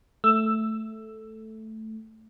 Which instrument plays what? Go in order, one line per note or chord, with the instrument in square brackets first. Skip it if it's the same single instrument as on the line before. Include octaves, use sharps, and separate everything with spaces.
[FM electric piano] A3 [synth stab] E6